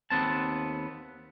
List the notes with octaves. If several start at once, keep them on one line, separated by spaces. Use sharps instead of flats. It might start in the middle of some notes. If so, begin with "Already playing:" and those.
D#2 B3 C4 A5